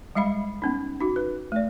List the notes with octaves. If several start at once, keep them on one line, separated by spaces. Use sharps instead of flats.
G3 G#3 E5 F5 B5
B3 C#4 D#4
D#4 F#4
B4
A3 D5